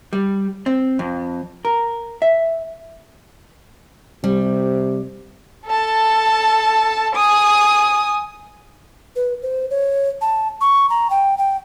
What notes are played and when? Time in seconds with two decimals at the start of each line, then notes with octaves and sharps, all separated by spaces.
0.13 G3
0.66 C4
0.99 F2
1.65 A#4
2.22 E5
4.24 C3 G3
5.67 A4 A5
7.15 G#5 D#6
9.16 B4
9.42 C5
9.70 C#5
10.21 A5
10.61 C#6
10.90 A#5
11.10 G5
11.38 G5